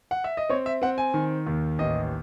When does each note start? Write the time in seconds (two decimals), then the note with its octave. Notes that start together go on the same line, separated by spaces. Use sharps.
0.11 F#5
0.24 E5
0.37 D#5
0.49 C4 C#5
0.66 E5
0.82 C4 F#5
0.98 G#5
1.14 D#3
1.47 D#2
1.79 A1 D#5